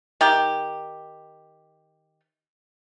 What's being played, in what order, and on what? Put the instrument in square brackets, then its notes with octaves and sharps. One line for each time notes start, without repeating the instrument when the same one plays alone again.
[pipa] D#3 G4